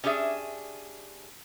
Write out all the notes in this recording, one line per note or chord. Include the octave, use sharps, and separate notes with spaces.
C#4 D4 G4 G#4 E5